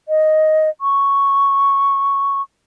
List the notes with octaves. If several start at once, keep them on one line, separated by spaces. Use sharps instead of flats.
D#5
C#6